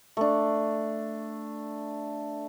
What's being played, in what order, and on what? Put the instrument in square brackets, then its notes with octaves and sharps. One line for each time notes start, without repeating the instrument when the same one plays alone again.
[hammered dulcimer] A3 D4